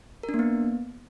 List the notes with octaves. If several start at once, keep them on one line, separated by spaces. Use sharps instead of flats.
A#4
D4
A#3
B3